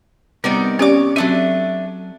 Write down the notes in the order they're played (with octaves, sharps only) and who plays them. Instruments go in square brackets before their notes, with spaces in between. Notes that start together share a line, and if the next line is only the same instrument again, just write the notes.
[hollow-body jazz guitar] C3 B3 [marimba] G3 [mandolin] D#4 A#4 D5
[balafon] C#4 G4 D5 [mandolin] C#5 D6
[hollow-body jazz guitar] F#3 E5 [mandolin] A3 D4 D#4 [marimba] C4